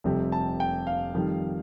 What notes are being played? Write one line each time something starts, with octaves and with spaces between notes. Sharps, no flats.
F1 F2 C3 G3
A5
G5
F5
F2 D#3 G3